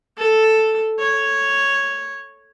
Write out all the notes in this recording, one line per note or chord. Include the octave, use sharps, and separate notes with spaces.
A4
C#5